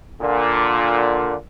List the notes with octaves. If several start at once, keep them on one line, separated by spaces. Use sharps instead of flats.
A#2 D3